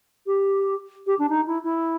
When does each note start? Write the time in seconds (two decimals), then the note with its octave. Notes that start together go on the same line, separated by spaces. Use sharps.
0.26 G4
1.07 G4
1.19 D4
1.29 D#4
1.47 E4
1.64 E4